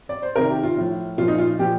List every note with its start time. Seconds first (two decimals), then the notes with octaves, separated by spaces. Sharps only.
0.09 D5
0.22 C5
0.35 C3 A#4
0.39 D#3
0.50 G4
0.63 F4
0.77 A2 F3
1.18 A#2 F3 F4
1.28 D#4
1.38 F4
1.59 A#2 F3 G4